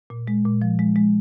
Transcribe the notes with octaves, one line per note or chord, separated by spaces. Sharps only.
A#2
G#3
A#2
F3
G#3
G#3